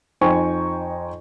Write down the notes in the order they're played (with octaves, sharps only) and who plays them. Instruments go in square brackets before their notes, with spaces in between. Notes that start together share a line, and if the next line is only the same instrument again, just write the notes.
[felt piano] F2 D#4 C5 G5 G#5 C#6